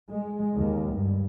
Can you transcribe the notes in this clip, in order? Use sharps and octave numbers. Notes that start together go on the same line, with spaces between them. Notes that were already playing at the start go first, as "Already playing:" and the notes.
G#3
D#2
G2